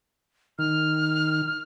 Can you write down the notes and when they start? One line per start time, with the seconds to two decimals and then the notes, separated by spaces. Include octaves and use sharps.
0.59 D#3 F6